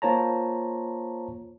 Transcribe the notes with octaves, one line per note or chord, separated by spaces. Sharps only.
A#3 F4 C5 C#5 A5 A#5